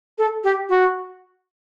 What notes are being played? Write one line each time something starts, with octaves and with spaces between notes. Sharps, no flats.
A4
G4
F#4